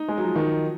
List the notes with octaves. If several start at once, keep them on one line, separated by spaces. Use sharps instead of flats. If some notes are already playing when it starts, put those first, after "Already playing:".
Already playing: D#4
G#3
F#3
F3
D#3